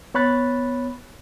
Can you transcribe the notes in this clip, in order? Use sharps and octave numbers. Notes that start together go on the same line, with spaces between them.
B3 C#5 B5 F#6 A6